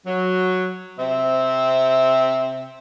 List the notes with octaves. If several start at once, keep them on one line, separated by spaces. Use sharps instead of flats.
F#3
C3 C4 E5